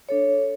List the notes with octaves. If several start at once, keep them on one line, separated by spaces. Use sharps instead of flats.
D4 A4 C#5